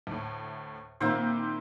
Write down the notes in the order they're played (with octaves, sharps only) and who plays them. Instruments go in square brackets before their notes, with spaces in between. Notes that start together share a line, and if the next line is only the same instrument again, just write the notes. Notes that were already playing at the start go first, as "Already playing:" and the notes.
[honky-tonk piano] D2 A2
[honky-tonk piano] A#2 D#3 E4 [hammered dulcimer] A#3 C4 C5